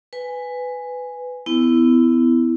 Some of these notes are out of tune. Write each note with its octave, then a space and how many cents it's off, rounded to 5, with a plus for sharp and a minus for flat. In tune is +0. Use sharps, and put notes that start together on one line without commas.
B4 +15 G#5 -5
B3 +30 E4 +0